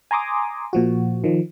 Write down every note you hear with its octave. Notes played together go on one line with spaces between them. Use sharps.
G#5 A#5 C6 D6 D#6
A#2 F3 F#4
D#3 F3